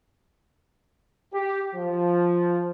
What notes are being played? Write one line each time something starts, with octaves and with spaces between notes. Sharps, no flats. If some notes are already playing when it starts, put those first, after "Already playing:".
G4
F3